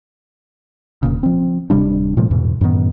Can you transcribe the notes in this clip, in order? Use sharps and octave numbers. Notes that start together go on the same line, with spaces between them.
E1 A#2 C#3
F3 C4
D1 C3 G3 D4
A2 C3 F3 G#3
E2 G#2 B2 E3
F#2 A2 D#3 B3